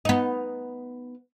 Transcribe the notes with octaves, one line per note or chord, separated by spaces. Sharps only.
B3 D#4